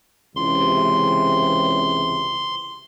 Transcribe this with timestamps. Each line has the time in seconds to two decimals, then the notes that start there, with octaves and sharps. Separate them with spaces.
0.36 C#2 C3 E3 C6